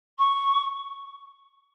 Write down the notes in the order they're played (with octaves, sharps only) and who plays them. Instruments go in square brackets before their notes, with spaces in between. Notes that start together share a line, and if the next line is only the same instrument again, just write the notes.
[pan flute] C#6